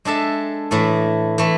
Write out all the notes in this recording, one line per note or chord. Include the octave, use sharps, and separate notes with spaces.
G#3 D4 A4 E5
A2 E3 A3
E3 A3